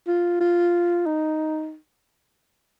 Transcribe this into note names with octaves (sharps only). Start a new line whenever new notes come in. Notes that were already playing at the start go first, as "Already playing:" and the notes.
F4
F4
D#4